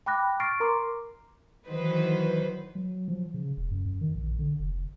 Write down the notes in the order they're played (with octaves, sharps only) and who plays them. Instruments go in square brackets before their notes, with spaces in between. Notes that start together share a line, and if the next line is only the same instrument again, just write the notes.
[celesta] G5 B5 D6 F#6 A#6
C#6 F6 A6 A#6 C7 D7
A#4 A#5 C6 D6
[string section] D#3 E3 F#3 B4 C5
[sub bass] F#3
F3
C#3
E1
F#2
F#2
D#3
A#1
D3
F1